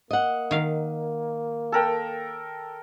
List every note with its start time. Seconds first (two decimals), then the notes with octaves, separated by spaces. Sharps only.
0.11 A#3 D#5 F#5
0.51 D#3 F5
1.72 A4 A#4 G5